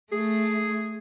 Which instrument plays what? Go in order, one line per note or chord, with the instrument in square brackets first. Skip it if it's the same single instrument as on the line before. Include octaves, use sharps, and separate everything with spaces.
[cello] A3 [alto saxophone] G#4